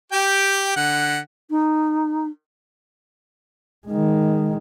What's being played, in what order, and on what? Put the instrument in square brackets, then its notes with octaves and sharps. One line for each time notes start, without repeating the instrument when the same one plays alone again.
[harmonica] G4 G5
D3 F#5
[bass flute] D#4
[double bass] D#3 G#3